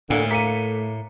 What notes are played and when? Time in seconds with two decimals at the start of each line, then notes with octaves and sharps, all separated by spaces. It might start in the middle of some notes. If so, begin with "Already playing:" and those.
0.10 D2 A2 D3 A#3
0.31 A3 A#3 B6 C#7 D#7